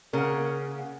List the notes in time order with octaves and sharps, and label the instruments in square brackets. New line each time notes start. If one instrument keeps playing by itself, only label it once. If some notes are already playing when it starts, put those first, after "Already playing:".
[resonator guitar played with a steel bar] C#3 [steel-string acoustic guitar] A#3 F5 F#5 [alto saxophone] A#4